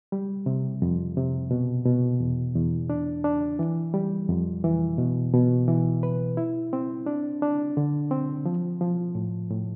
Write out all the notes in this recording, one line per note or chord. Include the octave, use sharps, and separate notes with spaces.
G3
C3
F2
C3
B2
B2
E2
E2
D4
D4
E3
G3
F2
E3
B2
B2
E3
B4
E4
C4
D4
D4
D3
C4
F3
F3
A2
A2